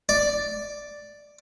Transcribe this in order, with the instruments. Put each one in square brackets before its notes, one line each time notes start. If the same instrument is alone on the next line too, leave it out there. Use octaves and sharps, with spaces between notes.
[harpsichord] D5